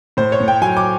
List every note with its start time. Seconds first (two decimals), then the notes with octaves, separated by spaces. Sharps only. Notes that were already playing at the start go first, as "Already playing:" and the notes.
0.17 A2 C5
0.32 C#5
0.40 A2
0.48 G5
0.62 F#3 G#5
0.77 D6